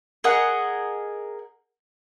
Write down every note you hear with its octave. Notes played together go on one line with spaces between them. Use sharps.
G#4 A#4 D#5 F#5